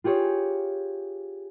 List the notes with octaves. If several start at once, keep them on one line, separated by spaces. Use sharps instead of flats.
F4 G4 G#4 C#5